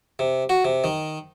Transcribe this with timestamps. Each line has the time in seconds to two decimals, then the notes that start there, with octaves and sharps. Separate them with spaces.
0.19 C3
0.49 F#4
0.64 C3
0.84 D#3